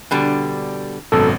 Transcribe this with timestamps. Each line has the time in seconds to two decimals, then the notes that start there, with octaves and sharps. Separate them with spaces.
0.11 B2 D3 G3
1.12 G#1 F#2 B2 A4